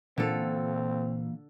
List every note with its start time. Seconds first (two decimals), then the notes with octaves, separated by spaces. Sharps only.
0.18 A#2 D3 E3 A#3 C4 A4 F5